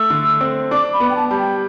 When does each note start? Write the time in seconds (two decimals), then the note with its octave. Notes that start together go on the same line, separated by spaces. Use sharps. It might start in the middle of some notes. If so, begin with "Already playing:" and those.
Already playing: A3 E6
0.10 D3
0.41 C4
0.71 D4 D6
0.93 B5
1.00 B3
1.10 G5
1.16 A5
1.29 G3 A5
1.39 G5